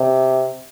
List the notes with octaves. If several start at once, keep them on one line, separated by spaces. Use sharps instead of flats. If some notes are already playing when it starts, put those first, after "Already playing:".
Already playing: C3